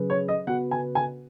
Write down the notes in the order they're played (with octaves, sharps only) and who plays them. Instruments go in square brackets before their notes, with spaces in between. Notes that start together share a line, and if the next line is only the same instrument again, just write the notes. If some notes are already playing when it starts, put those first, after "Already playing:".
Already playing: [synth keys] C#3 F#3 C#4 G#4 B4
[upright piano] C#5
D#5
[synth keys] C#3 B3 F#4 B4 [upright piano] F#5
[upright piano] G#5
G#5